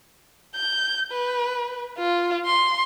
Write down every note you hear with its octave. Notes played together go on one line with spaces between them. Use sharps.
G6
B4
F4
C6